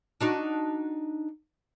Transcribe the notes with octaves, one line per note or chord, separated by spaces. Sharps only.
D4 D#4 F#4